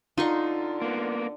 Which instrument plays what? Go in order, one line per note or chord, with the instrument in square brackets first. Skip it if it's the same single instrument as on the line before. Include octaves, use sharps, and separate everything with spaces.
[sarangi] D3 [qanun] D#4 C6 C#6 [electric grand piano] F4
[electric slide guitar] A#3 B3